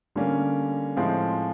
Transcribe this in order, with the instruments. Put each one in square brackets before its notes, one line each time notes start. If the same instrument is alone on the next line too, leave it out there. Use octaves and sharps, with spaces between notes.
[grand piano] D3 G3 A#3 C#4
A2 F3 G#3 C4